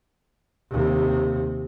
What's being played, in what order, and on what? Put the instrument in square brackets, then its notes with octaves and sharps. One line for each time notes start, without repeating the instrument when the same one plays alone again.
[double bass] D#2 C3